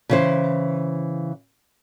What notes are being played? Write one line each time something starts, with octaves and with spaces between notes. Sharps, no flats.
C#3 E3 C5